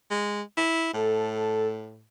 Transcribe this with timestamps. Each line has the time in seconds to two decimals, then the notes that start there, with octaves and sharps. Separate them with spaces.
0.11 G#3
0.57 E4
0.94 A2 A4